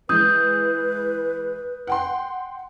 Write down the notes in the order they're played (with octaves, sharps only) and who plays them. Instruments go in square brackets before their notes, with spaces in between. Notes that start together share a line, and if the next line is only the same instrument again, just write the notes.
[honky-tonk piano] E3 G#3 [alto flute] B4 [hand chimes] D#6 G6
[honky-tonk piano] F#5 G5 C6